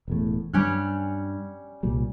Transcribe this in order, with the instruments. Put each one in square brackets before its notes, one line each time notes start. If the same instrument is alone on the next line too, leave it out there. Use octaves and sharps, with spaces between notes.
[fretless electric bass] E1 E2 A2
[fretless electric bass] G2 [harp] G3 C#4 F#6
[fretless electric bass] C2 A#2 G3